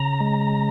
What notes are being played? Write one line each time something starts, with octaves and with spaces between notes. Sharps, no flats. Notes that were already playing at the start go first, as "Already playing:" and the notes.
Already playing: C#3 A#5
G#3